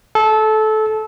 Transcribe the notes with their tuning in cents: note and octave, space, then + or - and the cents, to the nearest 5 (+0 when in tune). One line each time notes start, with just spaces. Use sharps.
A4 -20